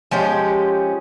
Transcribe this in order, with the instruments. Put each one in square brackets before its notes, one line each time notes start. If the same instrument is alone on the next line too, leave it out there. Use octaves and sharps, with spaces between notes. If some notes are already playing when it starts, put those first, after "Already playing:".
[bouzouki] F3 G#3 C#4 G4